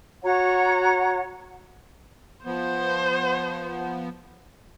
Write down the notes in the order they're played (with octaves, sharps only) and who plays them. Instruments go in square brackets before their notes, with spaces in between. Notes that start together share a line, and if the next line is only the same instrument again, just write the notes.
[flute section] F#4 C#5 F#5 A#5
[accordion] F3 B3 [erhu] C5